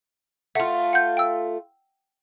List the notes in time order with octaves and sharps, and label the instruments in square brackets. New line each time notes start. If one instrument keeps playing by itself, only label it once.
[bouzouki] A3 F4 [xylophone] E5 F#5
[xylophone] F#5 G6
G5 E6